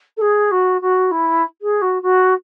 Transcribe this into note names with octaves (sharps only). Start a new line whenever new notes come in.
A4
G#4
F#4
F#4
E4
G#4
F#4
F#4